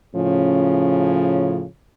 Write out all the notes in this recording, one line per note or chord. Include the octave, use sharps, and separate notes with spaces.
A2 C#3 F3 C#4